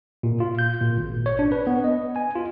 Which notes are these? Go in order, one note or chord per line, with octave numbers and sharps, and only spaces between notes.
A#2
F4
G6
A#2
G#1
C#5
D4
B4
B3
D#5
G#5
F4